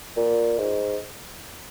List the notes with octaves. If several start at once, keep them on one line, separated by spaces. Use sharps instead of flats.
A#2
G#2